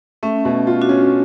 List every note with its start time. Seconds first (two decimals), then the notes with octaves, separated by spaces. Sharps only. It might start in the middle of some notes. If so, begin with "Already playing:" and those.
0.23 A3 C#4
0.45 B2
0.67 F4
0.81 D4 F#4
0.89 C#4